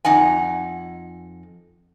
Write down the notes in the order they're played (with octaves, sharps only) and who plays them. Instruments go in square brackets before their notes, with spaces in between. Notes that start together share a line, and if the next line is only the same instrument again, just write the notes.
[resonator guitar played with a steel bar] F2 D#4 F#5 G#5